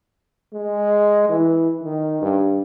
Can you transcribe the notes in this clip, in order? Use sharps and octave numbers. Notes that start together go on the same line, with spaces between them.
G#3
E3
D#3
G2